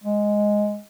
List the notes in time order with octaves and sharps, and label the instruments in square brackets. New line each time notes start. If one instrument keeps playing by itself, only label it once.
[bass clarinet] G#3